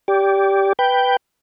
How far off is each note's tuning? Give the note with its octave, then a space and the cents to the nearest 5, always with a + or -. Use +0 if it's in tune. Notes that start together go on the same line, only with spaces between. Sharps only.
G4 +0 D5 -25
B4 +0 G5 +0